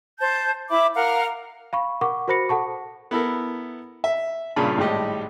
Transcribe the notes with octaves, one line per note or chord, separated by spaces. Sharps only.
C5 A5 G6
E4 E5 B5 D6
A#4 F5 F#5 A#5
F5 B5 C#6
A#4 F#5 C#6 D6
F#4 A#4 C5 B5 A#6 C#7
A4 F#5 A5 C#6
B3 E4 A4 A#4
E5
G2 A#2 C#3 D4 A5 B5
G#1 A2 G3 G#3 G4 D#5